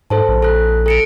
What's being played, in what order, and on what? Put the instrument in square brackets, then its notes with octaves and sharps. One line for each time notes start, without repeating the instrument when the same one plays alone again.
[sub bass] G#2 [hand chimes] A4 C5 A5
[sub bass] A#1
[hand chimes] A4 F#6
A4 C#7 D7